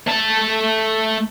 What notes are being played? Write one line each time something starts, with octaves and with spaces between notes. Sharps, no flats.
A3 A5